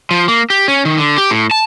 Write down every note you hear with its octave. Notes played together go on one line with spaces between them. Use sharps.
F3
A#3
G4
C#4
D#3
D3
G4
A2
A5